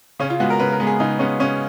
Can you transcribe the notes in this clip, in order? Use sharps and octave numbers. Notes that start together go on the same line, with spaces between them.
C#3 C#4
F4
G#3 B3 F#4
A#4
C#3 B4
A#4
G#3 B3
G#4
C#3 D#4
G#3 B3 C#4
C#3 C#4